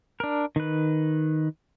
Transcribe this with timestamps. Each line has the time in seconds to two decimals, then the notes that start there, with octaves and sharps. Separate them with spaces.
0.20 D4 A#4
0.56 D#3 B4